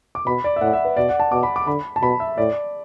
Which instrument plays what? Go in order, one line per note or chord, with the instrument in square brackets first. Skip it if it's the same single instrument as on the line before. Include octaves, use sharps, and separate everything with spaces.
[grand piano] D6
[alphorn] B2 [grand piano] B5
[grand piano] D5
E5
[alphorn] A2 [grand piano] F#5
[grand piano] E5
B4
[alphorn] B2 [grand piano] D5
[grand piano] F#5
A5
[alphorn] B2 [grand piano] D6
[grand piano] B5
D6
[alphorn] D3 [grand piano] B5
[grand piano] A5
[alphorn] B2 [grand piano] B5
[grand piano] E5
[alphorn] A2 [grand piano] D5